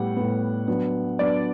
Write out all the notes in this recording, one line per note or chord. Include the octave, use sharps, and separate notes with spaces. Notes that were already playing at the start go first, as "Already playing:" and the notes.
Already playing: A2 G3 B3 F#5
A2 G3 B3
F#3 B3 D4
F#3 B3 D4 D5